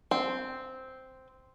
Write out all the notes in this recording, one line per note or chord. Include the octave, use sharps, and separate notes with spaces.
C4